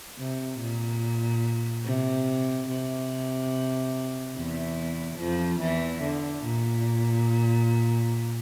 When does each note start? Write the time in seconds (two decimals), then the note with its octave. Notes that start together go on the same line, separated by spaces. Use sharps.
0.18 C3
0.60 A#2
1.84 C3
2.68 C3
4.35 E2 E3
5.19 F2 F3
5.60 E2 E3
6.02 D3
6.44 A#2